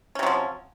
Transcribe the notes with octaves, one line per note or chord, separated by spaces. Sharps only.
C3 F3 F#3 C#4